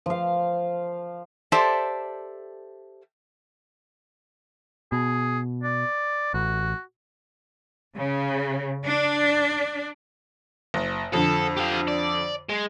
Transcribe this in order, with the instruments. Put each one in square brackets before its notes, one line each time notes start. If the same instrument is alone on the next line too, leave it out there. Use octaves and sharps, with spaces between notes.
[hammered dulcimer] F3 F5
[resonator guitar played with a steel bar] G4 A4 C5 D5 E5 A5
[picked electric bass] B2 [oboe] G#4
[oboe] D5
[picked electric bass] A1 [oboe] F#4
[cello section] C#3
D4
[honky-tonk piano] F#1
[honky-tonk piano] F2 D3 [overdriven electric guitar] A4
[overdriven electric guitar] G4 F5
D5
G#3